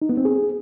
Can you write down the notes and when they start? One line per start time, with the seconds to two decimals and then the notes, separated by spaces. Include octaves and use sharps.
0.02 D#4
0.09 B3
0.17 C4
0.25 G#4